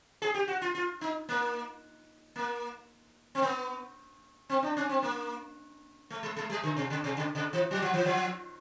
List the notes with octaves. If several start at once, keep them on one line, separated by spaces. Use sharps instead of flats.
G#4
G4
F#4
F4
F4
D#4
A#3
A#3
C4
B3
C4
D4
C#4
C4
A#3
A3
G#3
G#3
G3
D3
C3
C#3
C3
C#3
C#3
E3
F#3
F3
E3
F3